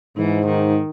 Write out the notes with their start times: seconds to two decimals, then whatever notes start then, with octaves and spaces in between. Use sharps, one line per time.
0.17 G#2 E3
0.46 D#3